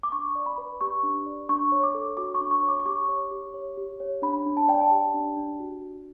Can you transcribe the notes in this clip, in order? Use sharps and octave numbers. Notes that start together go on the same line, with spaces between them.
D6
D4 C#6
D5
B5
B4
G4 C#6
D4
D5
D4 C#6
C#5
D6
A4
F#4 D6
C#6
D4
C#6
C#5
D6
D6
G4 C#6
C#5
G4
C#5
G4
C#5
D4 B5
D4
A5
D5 G5
A5
G4
D4
D4
F#4
F#4